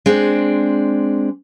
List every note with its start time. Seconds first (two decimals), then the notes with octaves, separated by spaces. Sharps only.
0.06 G#3 C4 D4